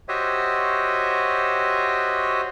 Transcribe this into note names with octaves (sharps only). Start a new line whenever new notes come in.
F#4 G4 C5 C#5 D#5 E5